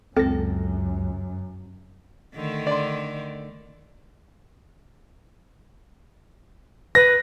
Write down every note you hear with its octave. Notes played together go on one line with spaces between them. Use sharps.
C#2 F#2 C4 A4 A#6
D3 D#3 A3
D5 C6
B4 A#6